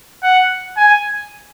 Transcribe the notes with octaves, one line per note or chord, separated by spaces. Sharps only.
F#5
G#5